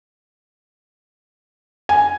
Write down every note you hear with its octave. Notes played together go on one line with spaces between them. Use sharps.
G#5